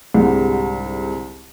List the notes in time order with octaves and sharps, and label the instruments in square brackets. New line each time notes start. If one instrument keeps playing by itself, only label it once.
[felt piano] C2 G#2 D3 G3 G#3